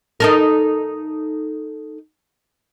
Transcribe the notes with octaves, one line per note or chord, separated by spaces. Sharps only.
D#4 A4 A#4